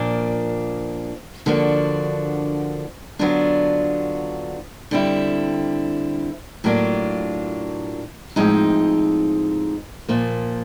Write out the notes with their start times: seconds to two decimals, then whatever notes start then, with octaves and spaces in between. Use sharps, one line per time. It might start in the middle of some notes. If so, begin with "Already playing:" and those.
Already playing: A#2 F3 A#3 D4
1.46 D3 F3 A#3 D4 F#4
3.19 D3 F#3 B3 D4 F4
4.91 D3 G3 C4 E4
6.64 A2 F#3 A#3 D4 F4
8.36 A2 F3 G#3 C4 D#4
10.09 A#2 F3 A#3